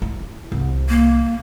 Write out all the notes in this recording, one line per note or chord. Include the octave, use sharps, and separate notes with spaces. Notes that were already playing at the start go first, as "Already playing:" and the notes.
E4
C2
A#3